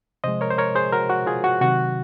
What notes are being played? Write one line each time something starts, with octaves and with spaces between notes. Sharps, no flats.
C3 F3 G#3 C5 D#5
A#4 C#5
C5
A#4 C#5
G#4 C5
F#4 A#4
F#4
F4 G#4
F#4
C3 D#3 F#3 F#4